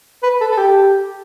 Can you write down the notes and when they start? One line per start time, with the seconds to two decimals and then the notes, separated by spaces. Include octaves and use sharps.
0.23 B4
0.41 A4
0.52 A4
0.58 G4